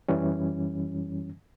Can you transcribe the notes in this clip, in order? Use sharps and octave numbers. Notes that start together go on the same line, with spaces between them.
F#2 E3 G3 C#4